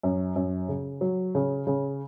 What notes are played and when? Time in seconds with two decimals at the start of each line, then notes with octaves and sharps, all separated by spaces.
0.03 F#2
0.36 F#2
0.69 C#3
1.01 F#3
1.35 C#3
1.67 C#3